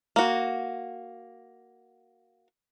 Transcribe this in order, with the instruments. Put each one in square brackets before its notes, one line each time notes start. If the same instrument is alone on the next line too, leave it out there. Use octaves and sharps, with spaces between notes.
[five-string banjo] A#3 F#4